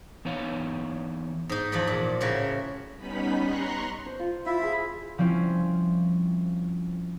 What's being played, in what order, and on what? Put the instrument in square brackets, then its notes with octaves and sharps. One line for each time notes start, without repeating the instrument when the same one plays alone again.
[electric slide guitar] E3 B3 D#4 C#5 F5
[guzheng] G#2 D#4
E2 F3 B4 D5 B5
A#2
A2 C#3 F#4 A#4 E5
[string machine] G3 B3 C#4 D#4 B5 B6
A#5 C6 C#6 F#6
[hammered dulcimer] C5
F4
[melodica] E4 E5 [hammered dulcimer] F4
[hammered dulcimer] G#4 F5
[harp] F3 G3 C4 C#4 E4